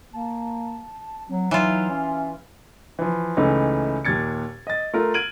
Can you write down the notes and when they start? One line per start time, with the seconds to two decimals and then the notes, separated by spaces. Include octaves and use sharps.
0.13 A#3 A5
1.29 F#3 C4
1.51 E3 F#3 D#4 F4
1.90 C#4 E5
2.99 E3 F3
3.37 C#2 E3 A3 C#4 D#4
4.05 D#2 A#2 G#6 A6 C#7
4.67 D#5 A6
4.94 A3 F4 A#4
5.14 F6 G#6 D7 D#7 F#7